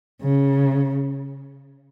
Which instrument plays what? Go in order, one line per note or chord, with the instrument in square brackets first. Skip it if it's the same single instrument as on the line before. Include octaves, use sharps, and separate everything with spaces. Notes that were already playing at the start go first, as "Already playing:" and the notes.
[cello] C#3